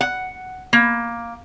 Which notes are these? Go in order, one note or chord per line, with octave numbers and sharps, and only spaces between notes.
F#5
A#3